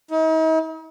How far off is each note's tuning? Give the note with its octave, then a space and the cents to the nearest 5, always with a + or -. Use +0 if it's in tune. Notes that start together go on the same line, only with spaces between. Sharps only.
D#4 +45